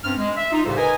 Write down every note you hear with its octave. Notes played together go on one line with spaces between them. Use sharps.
G2 C4 C#4 C5 F6
G#3
E5
D#4 F4
C2 A2 C#3 G4 A4 C5
A#4 B4 D#5 G#5